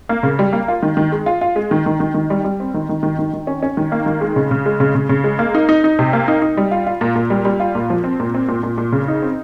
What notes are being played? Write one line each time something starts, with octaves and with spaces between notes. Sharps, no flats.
A#3
C#3
G3
A#3
F4
D#3
D#3
G#3
F4
F4
G#3
D#3
D#3
D#3
D#3
G3
G3
C4
D#3
D#3
D#3
D#3
D#3
C#4
C#4
D#3
A#3
D#3
G#3
C#3
C#3
G#3
C#3
C#3
C#3
G#3
A#3
D#4
D#4
D#4
C3
A#3
D#4
D#4
G3
F4
F4
A#2
A#2
G3
G3
F4
A#2
F3
C4
A#2
C4
A#2
A#2
A#2
C#3
D#4
C4